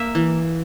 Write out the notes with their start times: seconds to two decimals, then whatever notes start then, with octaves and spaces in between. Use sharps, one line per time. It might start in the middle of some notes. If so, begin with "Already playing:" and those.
Already playing: A#3 E5
0.15 E3